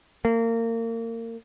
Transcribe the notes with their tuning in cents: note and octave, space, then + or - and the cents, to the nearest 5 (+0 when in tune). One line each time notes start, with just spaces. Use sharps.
A#3 -30